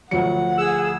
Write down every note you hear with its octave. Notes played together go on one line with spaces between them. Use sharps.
D2 F3 F#3 F#5 C#7
G#4 E6